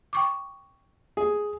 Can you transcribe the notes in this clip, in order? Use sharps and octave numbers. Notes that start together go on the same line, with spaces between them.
G5 C#6 D6
G#4